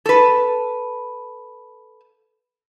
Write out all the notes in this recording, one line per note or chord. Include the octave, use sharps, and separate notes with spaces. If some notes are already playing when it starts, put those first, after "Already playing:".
A4 B4